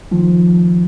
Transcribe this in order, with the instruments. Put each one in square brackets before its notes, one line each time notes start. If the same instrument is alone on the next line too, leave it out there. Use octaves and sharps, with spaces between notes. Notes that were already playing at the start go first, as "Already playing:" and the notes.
[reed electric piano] D#3 F3